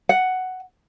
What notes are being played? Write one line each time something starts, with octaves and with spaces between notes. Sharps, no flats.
F#5